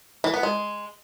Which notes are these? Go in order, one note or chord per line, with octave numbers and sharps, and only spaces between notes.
E3
B3
G#3